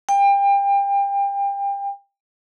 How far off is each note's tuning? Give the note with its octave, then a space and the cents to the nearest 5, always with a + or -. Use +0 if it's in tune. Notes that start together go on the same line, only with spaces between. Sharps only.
G5 +30